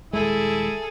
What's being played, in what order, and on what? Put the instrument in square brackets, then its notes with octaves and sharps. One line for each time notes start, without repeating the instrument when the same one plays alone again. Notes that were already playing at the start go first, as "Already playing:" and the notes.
[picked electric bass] D#1 E2 G#3 [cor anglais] E4 [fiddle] G#4 A4